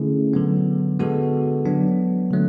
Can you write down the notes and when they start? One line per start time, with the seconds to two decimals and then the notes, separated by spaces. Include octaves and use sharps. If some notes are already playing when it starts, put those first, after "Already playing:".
Already playing: D3 A3 C#4 E4 G#4
0.33 D3 F#3 B3
0.99 D3 G#3 B3 F#4 A4
1.65 F#3 B3 D4
2.31 D3 F#3 A3